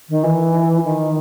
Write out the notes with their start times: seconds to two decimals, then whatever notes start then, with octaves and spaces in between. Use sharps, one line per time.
0.08 D#3
0.23 E3
0.83 D#3